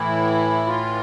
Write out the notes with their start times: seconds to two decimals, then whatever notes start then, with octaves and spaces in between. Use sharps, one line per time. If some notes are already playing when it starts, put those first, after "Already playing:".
Already playing: A2 E3 E4
0.67 F4